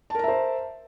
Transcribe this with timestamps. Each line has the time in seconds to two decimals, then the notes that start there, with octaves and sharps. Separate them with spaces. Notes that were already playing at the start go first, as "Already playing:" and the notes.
0.10 A5
0.15 A#4
0.19 A#5
0.24 E5
0.28 C5